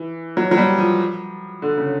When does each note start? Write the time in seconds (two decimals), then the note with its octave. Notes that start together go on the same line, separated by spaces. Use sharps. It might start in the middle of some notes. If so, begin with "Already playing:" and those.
Already playing: E3
0.37 F#3
0.51 F#3
0.58 G3
0.78 F3
1.62 D3
1.77 C#3